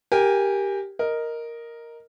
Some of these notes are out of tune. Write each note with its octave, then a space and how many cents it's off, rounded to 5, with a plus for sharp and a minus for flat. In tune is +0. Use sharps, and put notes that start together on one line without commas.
G4 +0 A#4 +0 G#5 -20
A#4 +0 D#5 +0